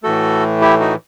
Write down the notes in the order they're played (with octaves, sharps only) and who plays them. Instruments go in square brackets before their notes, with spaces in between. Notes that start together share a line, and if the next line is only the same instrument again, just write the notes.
[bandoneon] A2 E3 A3 F#4 A4
E4 G4
D#4 F#4